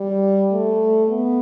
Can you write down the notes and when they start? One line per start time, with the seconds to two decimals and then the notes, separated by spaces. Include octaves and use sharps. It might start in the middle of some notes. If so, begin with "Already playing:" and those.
Already playing: G3
0.52 A3
1.09 B3